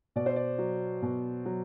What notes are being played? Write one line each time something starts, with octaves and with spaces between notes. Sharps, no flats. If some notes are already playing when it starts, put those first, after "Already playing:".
B2 D5
C5
D5
F#3
B2
F#3